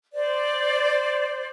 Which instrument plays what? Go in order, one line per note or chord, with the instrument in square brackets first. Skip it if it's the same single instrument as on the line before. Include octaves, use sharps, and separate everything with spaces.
[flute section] C5 D5